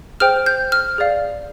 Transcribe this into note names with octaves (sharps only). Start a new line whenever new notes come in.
G#4 C5 G5 F6
G6
F6
G#4 D5 F5